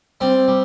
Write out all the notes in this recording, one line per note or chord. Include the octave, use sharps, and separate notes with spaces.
G3 C4
G3